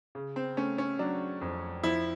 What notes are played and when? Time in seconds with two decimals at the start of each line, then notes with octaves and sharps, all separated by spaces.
0.15 C#3
0.36 C4
0.57 A3 C#4
0.78 C#4
0.99 F#3 D4
1.41 F2
1.83 F3 E4